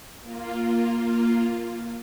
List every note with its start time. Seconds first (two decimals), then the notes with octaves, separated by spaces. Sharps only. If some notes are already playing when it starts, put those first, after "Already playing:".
0.21 A#3 F4